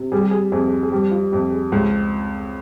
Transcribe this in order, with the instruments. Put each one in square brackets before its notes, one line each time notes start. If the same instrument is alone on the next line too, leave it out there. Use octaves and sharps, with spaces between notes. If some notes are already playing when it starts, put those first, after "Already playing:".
Already playing: [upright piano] C3
[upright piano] G3 [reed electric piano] G#4
[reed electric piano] G4
G#4
[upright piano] F2 [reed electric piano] G#4
[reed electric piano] G#4
G#4
[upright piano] G3 [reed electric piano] G4
[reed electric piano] F4
[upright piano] F2 [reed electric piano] G4
[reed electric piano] G#4
[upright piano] C#2 [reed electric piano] G4